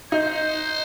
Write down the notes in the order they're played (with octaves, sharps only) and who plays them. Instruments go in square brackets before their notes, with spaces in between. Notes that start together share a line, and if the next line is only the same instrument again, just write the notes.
[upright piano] D#4 [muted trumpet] C5